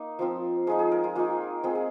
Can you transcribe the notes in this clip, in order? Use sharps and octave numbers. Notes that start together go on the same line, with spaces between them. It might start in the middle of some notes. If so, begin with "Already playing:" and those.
Already playing: A#3 D#4
F3 C4 F4
F3 G#3 D#4 G#4
G#4
A#4
F4
A#3 D#4 F4
G#3 C4 F4 G#4
G#4